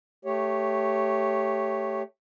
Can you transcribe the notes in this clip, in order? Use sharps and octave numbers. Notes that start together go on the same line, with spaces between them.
A3 G4 C#5